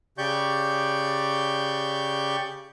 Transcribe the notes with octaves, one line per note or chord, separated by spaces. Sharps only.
C#3 G4 D5 C#6 G6